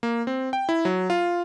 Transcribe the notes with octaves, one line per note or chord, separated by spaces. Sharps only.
A#3
C4
G5
E4
F#3
F4